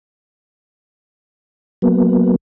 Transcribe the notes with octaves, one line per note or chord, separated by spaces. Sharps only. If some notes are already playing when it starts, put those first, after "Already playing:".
F#3 A#3 B3